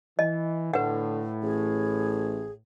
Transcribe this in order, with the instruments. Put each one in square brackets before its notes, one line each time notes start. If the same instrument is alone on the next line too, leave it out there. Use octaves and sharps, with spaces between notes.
[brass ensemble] E3 [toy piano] D#5
[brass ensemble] A2 [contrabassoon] D3 [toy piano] B4 F#5
[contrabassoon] A1 [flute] G#4